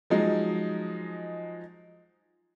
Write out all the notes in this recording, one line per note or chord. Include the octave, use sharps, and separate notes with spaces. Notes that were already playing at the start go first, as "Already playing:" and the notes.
F3 F#3 G#3 D#4